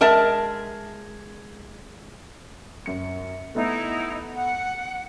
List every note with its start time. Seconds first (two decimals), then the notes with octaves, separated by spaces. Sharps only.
0.01 G#3 A#4 E5 A5
2.86 F#2 C#7
3.55 A3 B3 D#4 E4
4.36 F#5